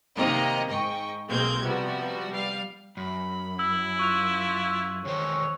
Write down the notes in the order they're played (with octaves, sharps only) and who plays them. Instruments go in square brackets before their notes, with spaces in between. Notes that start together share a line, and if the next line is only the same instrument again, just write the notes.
[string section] C3 D#3 A#3 C4 D#5 A#5
G#2 D#5 G5 C#6
B1 G#3 A#3 C4 G6 G#6
C3 F3 G3 B3 F#4
G3 F5
[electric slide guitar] F#2 [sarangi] B5
[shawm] E4 [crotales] E6
[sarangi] F4 [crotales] C#6 F#6 F7
[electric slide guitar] E2 D#3 C5 [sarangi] C#5